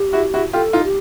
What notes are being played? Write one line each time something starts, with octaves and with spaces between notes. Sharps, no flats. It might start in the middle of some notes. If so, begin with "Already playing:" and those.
Already playing: G4
E4 F#4
E4 F#4
F4 G4 A4
D#4 F4
G4